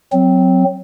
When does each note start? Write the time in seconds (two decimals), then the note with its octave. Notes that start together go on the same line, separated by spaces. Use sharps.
0.13 F#3 C4